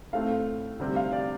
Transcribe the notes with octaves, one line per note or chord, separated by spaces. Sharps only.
A2 A3 C4 F5
D2 C3 G3 C4
F5
D5